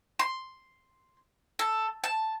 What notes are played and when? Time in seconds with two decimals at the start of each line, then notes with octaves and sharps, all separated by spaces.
0.19 C6
1.59 A4
2.04 A5